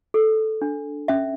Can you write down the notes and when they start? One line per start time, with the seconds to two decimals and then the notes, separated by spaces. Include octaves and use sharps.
0.14 A4
0.62 D4
1.08 C#4 E5